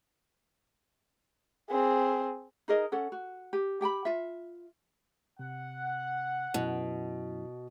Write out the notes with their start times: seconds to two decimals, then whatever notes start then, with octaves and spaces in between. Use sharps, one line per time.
1.70 C4 G#4
2.68 D#4 G#4 A#4 D#5
2.92 C#4 A4 F#5
3.12 F#4
3.53 G4
3.81 G4 G5 A5 B5
4.05 F4 E5
5.39 C3 F#5
6.54 F#2 B2 E4